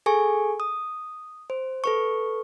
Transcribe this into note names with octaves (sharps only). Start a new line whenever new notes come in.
G#4 A4 G#5 C#6
D#6
C5
A4 B4 C#6